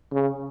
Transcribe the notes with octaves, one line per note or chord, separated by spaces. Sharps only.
C#3